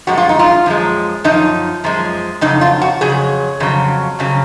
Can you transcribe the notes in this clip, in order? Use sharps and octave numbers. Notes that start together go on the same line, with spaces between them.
F#2 F3 G#3 F#4
F4
D#4
F4
F#2 F3 G#3
F#2 F3 D#4
F#2 F3 G#3
F2 C#3 F#3 D#4
F4
F#4
F2 C#3 F#3 G#4
F2 C#3 F#3
F2 C#3 F#3